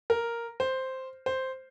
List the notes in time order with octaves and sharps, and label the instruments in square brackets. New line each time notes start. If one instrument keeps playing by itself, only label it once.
[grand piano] A#4
C5
C5